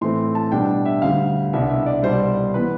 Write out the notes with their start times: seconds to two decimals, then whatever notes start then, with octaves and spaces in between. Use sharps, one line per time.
0.01 A2 E3 A3 C4 C6
0.35 A5
0.52 B2 G3 D4 G5
0.85 E5
1.02 D2 D3 G3 F5
1.53 C2 B2 B3 D4 E5
1.69 E5
1.86 D5
2.03 C2 B2 G3 C5
2.12 D5
2.21 C5
2.54 E3 B3 B4